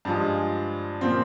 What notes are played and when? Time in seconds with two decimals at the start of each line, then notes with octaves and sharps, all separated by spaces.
0.05 G2 F3 G#3
1.01 A#2 F3 C4